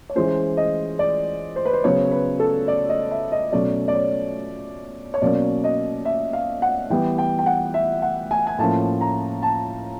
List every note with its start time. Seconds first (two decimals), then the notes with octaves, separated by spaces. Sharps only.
0.10 C#5
0.15 E3 G#3 C#4 C5
0.57 D#5
0.99 D5
1.56 C5
1.65 B4
1.73 C5
1.84 C#3 F#3 B3 C#5
2.12 B4
2.40 A4
2.68 D5
2.89 D#5
3.11 E5
3.32 D#5
3.52 B2 F#3 A3 C#4 D5
3.88 D5
3.94 C#5
5.14 C#5
5.22 B2 F#3 A#3 C#4 D5
5.64 D#5
6.05 E5
6.33 F5
6.62 F#5
6.90 E3 G3 B3 G5
7.18 G5
7.39 G5
7.46 F#5
7.74 E5
8.02 F#5
8.31 G#5
8.47 G#5
8.58 A2 F3 A#3 C#4 A5
9.01 A#5
9.43 A5